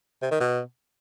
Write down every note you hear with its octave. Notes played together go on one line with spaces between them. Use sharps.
C3
D#3
B2